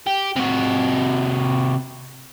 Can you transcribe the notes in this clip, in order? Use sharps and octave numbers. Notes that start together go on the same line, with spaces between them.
G4
C3 F#4